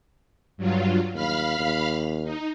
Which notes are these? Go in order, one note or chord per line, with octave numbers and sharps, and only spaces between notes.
G2 F#3 F4
D#2 F5 B5 F6
D#2
D#4